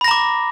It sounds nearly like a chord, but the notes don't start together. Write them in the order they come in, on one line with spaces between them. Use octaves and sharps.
B5 A#6 A#5 D6